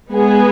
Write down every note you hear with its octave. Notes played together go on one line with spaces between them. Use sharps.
G#3 B3 G#4